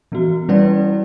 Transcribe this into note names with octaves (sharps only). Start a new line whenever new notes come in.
E3 B3 F#4
G3 C#4 E4 B4 D5